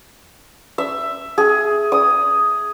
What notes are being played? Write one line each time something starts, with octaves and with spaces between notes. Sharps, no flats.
E5
G#4
D#6